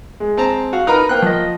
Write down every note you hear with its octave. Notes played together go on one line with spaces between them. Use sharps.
G#3
C4 A5 A#5
F#4 F5
D#4 A#4 B4 A#5 F6
A#3 B3 C5 G5 F#6
F3 F#3 D#5